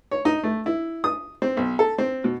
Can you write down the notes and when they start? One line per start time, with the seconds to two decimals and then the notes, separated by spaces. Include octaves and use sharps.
0.11 C#5
0.25 D#4
0.44 A3
0.66 E4
1.04 D#6
1.42 C4
1.57 B1
1.79 A4
1.98 C4
2.24 B2